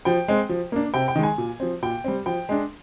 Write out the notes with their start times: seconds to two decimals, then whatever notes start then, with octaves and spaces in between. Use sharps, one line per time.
0.05 F3 G5
0.28 G#3 C4
0.49 F3
0.72 A#3 D4
0.94 C3 G5
1.08 G5
1.15 D#3 G#3
1.23 G#5
1.38 A#2
1.60 F3 C4
1.82 A#2 G5
2.04 G3 C4
2.26 F3 G5
2.49 G#3 D4